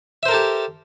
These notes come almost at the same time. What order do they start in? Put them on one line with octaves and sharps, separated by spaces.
E5 C5 A#4 A4 G4